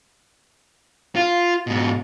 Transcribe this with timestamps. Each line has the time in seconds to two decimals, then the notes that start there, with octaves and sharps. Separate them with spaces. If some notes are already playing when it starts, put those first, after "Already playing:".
1.16 F4
1.67 G#2 B2